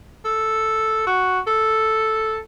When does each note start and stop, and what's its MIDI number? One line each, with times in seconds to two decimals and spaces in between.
0.25 1.05 69
1.07 1.40 66
1.47 2.39 69